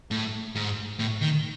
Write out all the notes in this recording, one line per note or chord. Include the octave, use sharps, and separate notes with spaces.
A2
G#2
A2
D#3